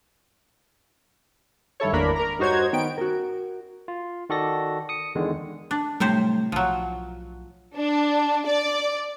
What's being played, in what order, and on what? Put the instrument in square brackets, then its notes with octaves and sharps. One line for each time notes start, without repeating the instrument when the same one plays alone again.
[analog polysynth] G2 D#3 E4 A4 C#5
G#1 E2 A#3 D4 A#4 B5
A#4 A#5
G2 D#4 F#4 C5 C#5 G#6
D#3 B3 G5 D7
[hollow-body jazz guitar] F#4 A#4
[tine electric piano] F4
D#3 F#4 A4 D5 A#6
D#6 C#7
E2 D3 D#3 G#3
[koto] D4
[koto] A2 C3 C5 [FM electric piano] F#3 G3 A3
[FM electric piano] B1 [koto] F3 F#3
[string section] D4
D5